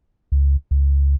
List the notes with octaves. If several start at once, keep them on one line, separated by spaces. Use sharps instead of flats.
C#2
C#2